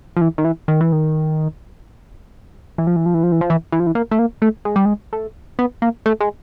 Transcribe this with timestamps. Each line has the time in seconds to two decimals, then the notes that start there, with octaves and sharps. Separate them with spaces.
0.17 F3
0.21 E3
0.38 D#3
0.45 E3
0.68 D#3
0.81 E3
0.92 D#3
2.78 E3
2.87 F3
2.96 E3
3.06 F3
3.14 E3
3.23 F3
3.32 E3
3.41 F3
3.50 E3
3.72 E3
3.80 F3
3.87 E3
3.95 A#3
4.11 A3
4.19 A#3
4.42 A3
4.65 G#3
4.76 G3
4.85 G#3
5.13 A3
5.59 B3
5.82 A#3
6.06 A3
6.20 G#3